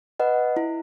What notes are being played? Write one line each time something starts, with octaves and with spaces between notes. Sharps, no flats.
B4 D#5 F#5
E4